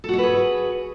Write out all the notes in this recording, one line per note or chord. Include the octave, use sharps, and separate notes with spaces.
F#4 G#4 A4 B4 C#5